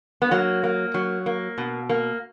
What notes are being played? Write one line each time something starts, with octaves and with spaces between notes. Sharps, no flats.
B3
F#3 A#3
A#3
F#3
A#3
B2
A#3